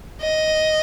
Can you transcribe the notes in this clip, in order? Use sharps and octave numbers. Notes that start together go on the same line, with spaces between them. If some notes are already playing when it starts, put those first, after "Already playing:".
D#5